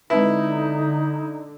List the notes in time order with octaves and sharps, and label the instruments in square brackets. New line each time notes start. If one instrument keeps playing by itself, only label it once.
[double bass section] D3 [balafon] G#3 C4 B4 [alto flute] D#4 [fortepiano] E4